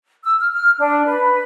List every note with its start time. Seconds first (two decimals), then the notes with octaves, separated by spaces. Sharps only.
0.25 E6
0.40 F6
0.52 F6
0.78 D4
1.06 B4